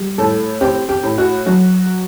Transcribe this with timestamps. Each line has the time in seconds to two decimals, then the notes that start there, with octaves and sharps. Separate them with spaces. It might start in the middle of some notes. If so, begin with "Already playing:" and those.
Already playing: G3
0.18 A2 A4
0.61 C4 G4
0.89 G4
1.03 A2
1.18 F#4
1.46 F#3 F#4